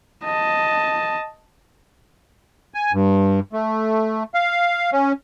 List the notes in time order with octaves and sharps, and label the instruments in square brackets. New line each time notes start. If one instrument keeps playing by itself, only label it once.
[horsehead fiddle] D#5 A5
[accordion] G#5
G2
A3
F5
C#4